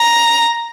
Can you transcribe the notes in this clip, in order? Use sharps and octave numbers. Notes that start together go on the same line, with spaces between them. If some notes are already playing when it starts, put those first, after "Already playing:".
Already playing: A#5